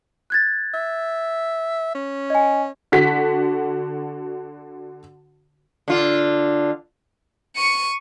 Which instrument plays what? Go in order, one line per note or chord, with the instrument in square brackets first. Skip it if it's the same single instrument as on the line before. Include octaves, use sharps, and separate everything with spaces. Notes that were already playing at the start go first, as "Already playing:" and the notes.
[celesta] F#6 G#6 A6
[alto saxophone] E5
C#4
[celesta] D#5 G#5
[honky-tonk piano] D3 F#4 B6
[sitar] D3 F4
[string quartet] C#6 [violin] C#7 D#7